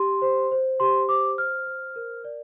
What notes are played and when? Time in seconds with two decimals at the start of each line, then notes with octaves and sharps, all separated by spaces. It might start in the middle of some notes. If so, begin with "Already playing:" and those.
Already playing: G4 C6
0.22 C5
0.51 C5
0.80 G4 C6
1.09 C5 D6
1.38 C5 F6
1.67 C5
1.96 A#4
2.24 D5